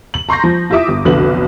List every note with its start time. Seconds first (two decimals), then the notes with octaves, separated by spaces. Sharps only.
0.14 F#7
0.29 A#5 C6 C#6 G6 A#6
0.44 F3
0.70 E4 F4 G4 E5 D6 D#6
0.88 G1
1.05 F1 B1 D3 B4 F#7